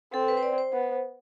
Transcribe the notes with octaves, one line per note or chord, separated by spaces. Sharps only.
C4 A4
B4
C5
D5
C5
B3